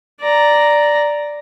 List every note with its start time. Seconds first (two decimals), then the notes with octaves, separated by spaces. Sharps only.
0.21 D5 A#5